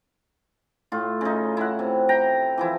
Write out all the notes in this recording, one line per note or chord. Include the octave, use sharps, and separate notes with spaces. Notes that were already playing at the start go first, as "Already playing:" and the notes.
A2 F4
C#3 D#4
E4 F#5
C3
G5 A#5
E3 F3 E4